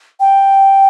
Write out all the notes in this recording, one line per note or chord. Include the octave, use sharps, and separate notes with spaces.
G5